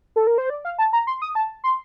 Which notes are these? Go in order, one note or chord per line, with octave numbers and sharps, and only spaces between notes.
A4
A#4
C5
D5
F5
A5
A#5
C6
D#6
A5
C6